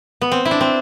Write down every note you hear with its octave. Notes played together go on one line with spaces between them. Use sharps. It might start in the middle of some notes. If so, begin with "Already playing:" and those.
B3
C4
E4
D4
C4